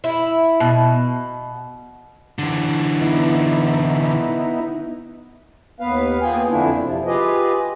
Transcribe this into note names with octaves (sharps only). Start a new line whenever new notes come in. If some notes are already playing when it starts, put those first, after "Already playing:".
E4
B2
D3 E3
B3 D#4 E4
D#2 B3 B4 F5
A#3 B3 F4 G#4 G5 G#5
F2 D3 A3 D4 E4
C3 F3
F4 G4 G#4 B4 D#5